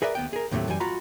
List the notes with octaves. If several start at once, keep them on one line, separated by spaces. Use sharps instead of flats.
G#4 A#4 B4 D5 E5
D#2 B3 G5
G#4 A#4
D#2 A2 C3 F#3 A3
F#2 E3 G3 G#5
F4 F#4 A#5 B5